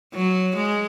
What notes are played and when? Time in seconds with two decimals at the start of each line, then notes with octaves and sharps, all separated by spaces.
0.14 F#3
0.56 G#3